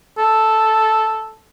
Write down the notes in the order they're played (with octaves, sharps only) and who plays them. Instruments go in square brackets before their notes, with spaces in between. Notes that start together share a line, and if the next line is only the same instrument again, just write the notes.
[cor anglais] A4